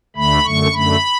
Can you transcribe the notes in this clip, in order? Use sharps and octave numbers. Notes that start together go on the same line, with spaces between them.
D2 D3 A3 B5
F#2 D3 A3 C#6
F#2 D3 A3 B5